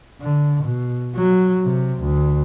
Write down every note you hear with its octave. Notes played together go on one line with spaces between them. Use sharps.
D3
B2
F#3
C3
D2